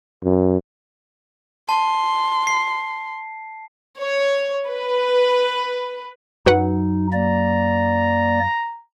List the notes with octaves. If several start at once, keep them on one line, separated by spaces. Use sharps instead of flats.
F#2
A5 C6
C7
C#5
B4
F#2 F#3 D#4 F#4 B4 F#5
A#3 D5 A#5